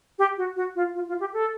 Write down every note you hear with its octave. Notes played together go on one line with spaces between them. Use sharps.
G4
F#4
F#4
F4
F4
F4
G4
A4